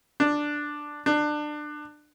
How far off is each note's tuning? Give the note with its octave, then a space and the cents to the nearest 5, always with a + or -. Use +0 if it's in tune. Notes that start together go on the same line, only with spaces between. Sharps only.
D4 +5
D4 +25